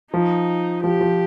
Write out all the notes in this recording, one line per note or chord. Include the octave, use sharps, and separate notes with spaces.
F3 D#4
F3 G4
F3